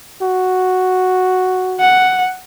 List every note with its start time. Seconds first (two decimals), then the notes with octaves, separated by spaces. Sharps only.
0.22 F#4
1.80 F#5